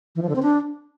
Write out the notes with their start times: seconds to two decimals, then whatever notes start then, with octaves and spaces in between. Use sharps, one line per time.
0.16 E3
0.22 F3
0.29 D3
0.36 C4
0.42 D4